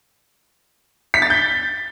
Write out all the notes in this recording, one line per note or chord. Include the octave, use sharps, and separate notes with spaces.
B6
A6
G6